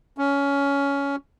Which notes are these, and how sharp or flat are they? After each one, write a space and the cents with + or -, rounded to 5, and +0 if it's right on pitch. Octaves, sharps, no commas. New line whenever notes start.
C#4 +15